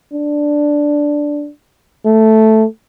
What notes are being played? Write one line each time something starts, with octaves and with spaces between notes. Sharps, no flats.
D4
A3